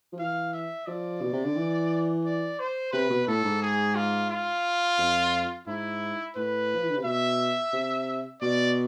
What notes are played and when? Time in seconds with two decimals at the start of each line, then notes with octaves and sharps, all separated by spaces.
0.13 F3
0.19 E3 F5
0.53 E5
0.87 F3 D5
1.22 B2
1.33 C3
1.44 D3
1.56 E3
2.25 D5
2.59 C5
2.92 C3 B4
3.10 B2
3.27 A2 A4
3.44 G#2
3.62 G#4
3.95 F4
4.30 F4
4.98 F2
5.67 G#2 E4
6.36 A2 B4
6.75 F3
6.82 E3
6.90 D3
6.97 C3
7.04 B2 E5
7.73 C3
8.41 B2 D5